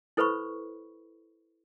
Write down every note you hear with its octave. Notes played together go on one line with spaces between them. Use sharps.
E4 A4 B4 C5 B5 C#6